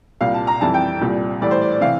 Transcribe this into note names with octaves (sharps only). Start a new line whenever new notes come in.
C2 A#2 G3 F5
A5
A#5
F2 E3 G3 A5
G5
C2 A#2 G3
A2 E3 G3 D5
C5
D5
D5
C3 E3 F5